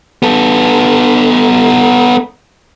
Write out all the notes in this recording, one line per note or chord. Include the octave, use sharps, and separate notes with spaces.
B3 A4